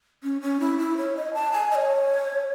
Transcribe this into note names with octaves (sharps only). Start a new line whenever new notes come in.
C#4
C#4
E4
E4
C#5
D#5
A5
G#5
D#5
C#5